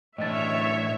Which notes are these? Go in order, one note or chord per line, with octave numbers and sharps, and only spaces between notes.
A2 E3 D4 C#5 D#5 E5 A6